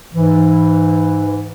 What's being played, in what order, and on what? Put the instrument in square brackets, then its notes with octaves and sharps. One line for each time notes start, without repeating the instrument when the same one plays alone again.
[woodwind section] G#2 E3